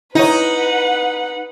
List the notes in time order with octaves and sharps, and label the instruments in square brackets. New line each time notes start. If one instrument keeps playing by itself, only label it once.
[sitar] D#4 [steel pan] E4 C#5 [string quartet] B4 F#5